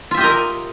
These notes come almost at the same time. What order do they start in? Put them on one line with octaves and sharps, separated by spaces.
F4 E5 G4 D#5 A#4